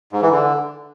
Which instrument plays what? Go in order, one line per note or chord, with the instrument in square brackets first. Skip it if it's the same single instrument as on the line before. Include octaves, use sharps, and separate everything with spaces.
[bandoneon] G#2
E3
D3